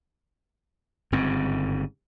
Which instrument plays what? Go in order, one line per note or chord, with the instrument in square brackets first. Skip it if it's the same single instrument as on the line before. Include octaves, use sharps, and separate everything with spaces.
[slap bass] G1 G#2 C#3 C4